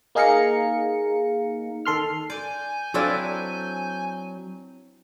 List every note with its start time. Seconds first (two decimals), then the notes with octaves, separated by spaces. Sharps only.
0.15 A#3 D#4 G#4 F5 A#5 C#7
1.85 D#3 A4 C6 F6
2.30 D5 G#5 G6
2.94 F#3 C4 D4 E4 F4 A4 D5